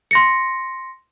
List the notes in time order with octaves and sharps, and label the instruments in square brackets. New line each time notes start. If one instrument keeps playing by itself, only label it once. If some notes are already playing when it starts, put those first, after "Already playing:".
[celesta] C6 A#6 C#7